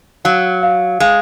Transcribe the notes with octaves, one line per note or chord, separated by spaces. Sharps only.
F#3 F5
F5
G#3 F5